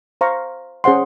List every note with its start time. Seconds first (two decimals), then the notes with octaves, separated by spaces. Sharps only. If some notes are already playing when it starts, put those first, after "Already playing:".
0.21 C5 F5 A#5 C#6
0.84 C#4 G#4 C5 F#5 C6